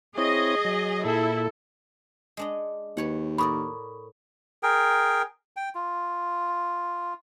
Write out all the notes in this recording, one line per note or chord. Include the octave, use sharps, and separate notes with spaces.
C4 E4 G#4 C#5 D#5
F#3
A#2 E4 A4
G#3 D4 D#5
D#2 B4 C#5 F#5
A2 A#4 D5 B5 C#6 D#6
G#4 A#4 G5
G5
F4